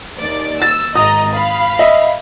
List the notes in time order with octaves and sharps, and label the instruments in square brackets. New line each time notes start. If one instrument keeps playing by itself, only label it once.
[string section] D#2 D5
[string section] E6 [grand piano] A6
[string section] G#1 D#5 A#5 [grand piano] D#6
[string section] F5 B5
[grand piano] D#5 E5